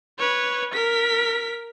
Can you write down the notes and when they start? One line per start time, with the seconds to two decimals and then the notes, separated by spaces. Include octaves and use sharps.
0.19 B4 C#5
0.73 A#4 B6